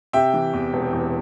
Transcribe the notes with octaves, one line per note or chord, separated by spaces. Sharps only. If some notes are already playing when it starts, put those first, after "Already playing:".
C3 E5 G5
E3
E2
E1
E2